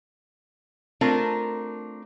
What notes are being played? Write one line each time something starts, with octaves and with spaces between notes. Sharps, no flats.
A3 C4 D4 F4 A#4